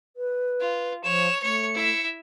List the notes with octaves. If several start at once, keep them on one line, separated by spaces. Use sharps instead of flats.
B4
F4
F3 C#5 E7
A3 C#5 C#7
E4 E5